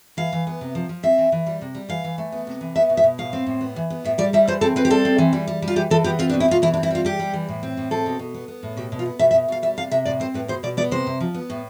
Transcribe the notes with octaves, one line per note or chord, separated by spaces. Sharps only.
E3 F5
E3
B3
C3
F3
F3
C4 E5
E3
E3
G3
C3
G3
E3 F5
E3
A3
B3
C3
E3
B3 E5
B2
E5
B2
A2 F5
C4
A2
B3
E3
B3
A2 E5
G3 D5
G3 E5
E3 C5
C4 A4
C4 B4
G4
G3 A4
C4
E3
G3
G3
G3
F4
E3 G4
E3 A4
B3 G4
C4 F4
D4
B2
E4
B2 F4
E3 E4
D4
C4
E4
G3 F4
G3 G4
G3
E3
A2
C4
A2
C4 A4
B2
B2
B3
B3
A2
B2 G4
B2
F4
B3
B2 E5
E5
B2
B2 F5
G3 E5
C3 F5
C3 E5
A2 D5
C4 C5
A2 B4
B2 C5
B2 D5
B3 D5
C3 C5
C3
F3
B3
A2